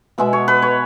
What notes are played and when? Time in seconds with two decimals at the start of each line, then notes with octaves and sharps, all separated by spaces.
0.18 B2 G#3 B3 E5
0.33 C#5
0.48 B4
0.62 C#5